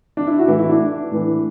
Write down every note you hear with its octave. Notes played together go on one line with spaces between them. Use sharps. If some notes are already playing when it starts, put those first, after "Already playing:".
D4
E4
F#4
A2 E3 E4
E4
D4
A2 E3